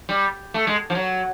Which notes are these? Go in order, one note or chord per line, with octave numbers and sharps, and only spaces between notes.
G3
A3
G#3
F3
F#3